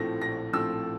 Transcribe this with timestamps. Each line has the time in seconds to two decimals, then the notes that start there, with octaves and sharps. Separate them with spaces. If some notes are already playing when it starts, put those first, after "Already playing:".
Already playing: A#1 A2 F3 A3 C4 A#6
0.21 A#1 A#6
0.53 A2 F3 A3 C4 E6